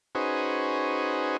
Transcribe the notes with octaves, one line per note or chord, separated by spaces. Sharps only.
C#4 D#4 F#4 G#4 B4 C5